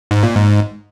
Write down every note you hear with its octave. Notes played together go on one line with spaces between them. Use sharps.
G#2
A#2
G#2